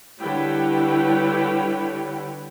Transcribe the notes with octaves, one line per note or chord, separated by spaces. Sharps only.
D3 G3 E4 B4 C#5 G5